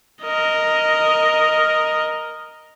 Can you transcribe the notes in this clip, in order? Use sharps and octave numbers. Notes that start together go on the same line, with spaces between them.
A#4 D#5